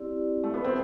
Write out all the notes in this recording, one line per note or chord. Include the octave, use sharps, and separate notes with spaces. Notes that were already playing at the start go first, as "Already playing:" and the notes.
Already playing: C4 E4 G4 D5
A3
B3
C4